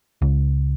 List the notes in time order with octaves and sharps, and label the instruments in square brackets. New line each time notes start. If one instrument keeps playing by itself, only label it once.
[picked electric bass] C#2